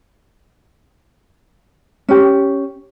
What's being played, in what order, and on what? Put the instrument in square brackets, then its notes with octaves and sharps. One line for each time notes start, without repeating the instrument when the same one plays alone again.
[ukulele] C#4 G4